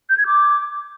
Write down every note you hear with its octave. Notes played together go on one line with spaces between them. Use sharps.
G6
G#6
D6